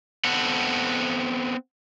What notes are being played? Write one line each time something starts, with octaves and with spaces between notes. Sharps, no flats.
B3 C4 A4 F#5